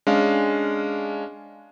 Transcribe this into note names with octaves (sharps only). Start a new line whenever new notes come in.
G#3 C#4 D4 F5